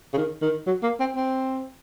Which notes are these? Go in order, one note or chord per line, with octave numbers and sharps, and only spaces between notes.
C#3
D#3
D#3
F#3
A#3
C4
C4